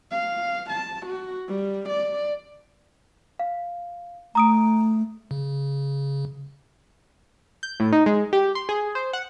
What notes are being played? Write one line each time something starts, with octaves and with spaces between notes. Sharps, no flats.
F5
A5
F#4
G3
D5
F5
A3 A#5 D#6 D7
C#3
G6
A2
D#4
G#3
G4
C6
G#4
C5
F#5